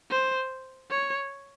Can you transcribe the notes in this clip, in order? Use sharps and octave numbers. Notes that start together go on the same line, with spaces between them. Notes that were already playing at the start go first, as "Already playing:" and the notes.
C5
C#5